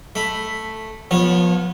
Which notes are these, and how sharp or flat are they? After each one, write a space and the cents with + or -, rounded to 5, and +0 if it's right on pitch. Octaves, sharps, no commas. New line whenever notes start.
A3 +0 B5 +0
F3 +15 B3 -20 C#5 -25